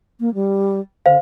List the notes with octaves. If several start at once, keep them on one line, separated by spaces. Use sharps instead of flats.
A#3
G3
D3 C5 F5